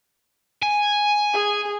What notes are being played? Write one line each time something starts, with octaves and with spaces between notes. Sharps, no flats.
G#5
G#4